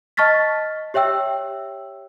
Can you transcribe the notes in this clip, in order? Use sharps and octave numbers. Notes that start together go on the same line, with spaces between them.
D#5 A5 C#6 F6 A6 B6
G4 C#5 E5 G5 E6